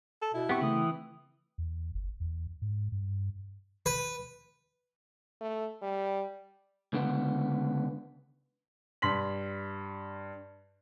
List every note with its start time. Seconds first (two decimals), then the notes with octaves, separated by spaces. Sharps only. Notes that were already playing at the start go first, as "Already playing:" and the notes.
0.22 A4
0.34 B2 E4
0.49 B3 C4 G4 F#5 C#6
0.61 C#3 E3 A3 D#6
1.58 E2
1.94 F#1
2.20 E2
2.62 G#2
2.92 G2
3.86 B4
5.41 A3
5.82 G3
6.93 C#2 D3 B3
9.02 G2 C6 B6 F#7